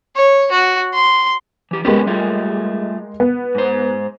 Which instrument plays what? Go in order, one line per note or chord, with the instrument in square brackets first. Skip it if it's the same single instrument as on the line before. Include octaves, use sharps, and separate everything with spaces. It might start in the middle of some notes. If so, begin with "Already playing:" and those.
[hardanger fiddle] C#5
F#4
C6
[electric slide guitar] E3 G4
[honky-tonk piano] G#3 A#3 G4 [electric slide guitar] B3 C#4 B4
[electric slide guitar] G3 A3 F4
[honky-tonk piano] B3
[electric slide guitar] G#2 C5